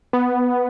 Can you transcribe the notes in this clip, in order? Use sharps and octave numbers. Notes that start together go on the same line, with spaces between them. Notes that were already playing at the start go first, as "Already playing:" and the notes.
B3